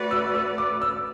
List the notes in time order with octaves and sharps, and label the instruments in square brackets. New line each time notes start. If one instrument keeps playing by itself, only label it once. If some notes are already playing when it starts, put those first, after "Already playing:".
Already playing: [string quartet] A3 F#4 B4 D5
[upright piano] E6
E6
D6
E6